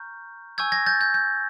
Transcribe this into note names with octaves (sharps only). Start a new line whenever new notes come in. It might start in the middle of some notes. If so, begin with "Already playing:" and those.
Already playing: A#5 C#6 F6 G6
G#5 C#6 E6 G6 G#6
G#6 A#6
G6 A6
G6
G6